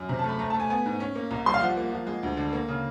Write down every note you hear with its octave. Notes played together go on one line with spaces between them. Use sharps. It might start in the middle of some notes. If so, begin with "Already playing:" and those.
Already playing: F#2
C3 A#5
A5
A3 B5
A3 A#5
A5
A3
G#5
B3 G#5
G#2
C#4
A#3
C2 A#5
G3 C6
F5
F3 F#5
A#3
F3
G#3
D2
D3
A#3
C#3